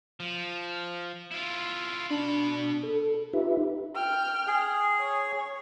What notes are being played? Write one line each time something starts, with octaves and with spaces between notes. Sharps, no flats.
F3
E4 F4
B2 D4 B5
A4
D#4 F4 G4 B4 E5
G5 F6
G#4
C#5